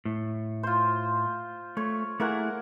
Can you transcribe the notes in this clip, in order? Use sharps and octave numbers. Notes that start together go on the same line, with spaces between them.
A2
F4 C5
A3 C#5
A3 A#3 E4 G#4 A#4 F#5